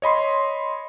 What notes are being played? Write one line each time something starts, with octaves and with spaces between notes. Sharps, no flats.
C#5 D#5 B5 C6